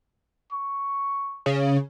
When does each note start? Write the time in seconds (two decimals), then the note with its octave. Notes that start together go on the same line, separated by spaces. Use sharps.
0.52 C#6
1.46 C#3